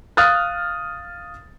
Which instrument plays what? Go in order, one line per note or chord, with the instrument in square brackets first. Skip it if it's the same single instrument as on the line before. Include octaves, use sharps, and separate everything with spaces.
[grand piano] F5 D#6 F6 F#6 A6